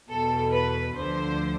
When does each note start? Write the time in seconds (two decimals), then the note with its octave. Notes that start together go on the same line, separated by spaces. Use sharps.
0.08 E2 B2 A4
0.52 B4
0.96 D2 D3 F3 C5